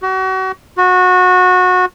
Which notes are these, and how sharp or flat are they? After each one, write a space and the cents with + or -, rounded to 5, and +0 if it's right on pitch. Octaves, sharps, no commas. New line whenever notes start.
F#4 +35
F#4 -20